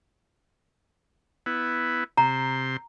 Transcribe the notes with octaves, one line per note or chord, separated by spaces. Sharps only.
B3 E4
C3 A#5 C6